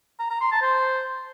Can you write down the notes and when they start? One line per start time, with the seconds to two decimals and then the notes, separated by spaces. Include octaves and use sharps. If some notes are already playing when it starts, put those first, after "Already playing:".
0.19 A#5
0.30 A#5
0.41 C6
0.51 A5
0.62 C5